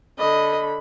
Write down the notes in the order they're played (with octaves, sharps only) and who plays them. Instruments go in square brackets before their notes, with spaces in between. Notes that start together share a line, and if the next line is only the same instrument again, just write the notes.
[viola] D3 B5 [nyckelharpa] D#5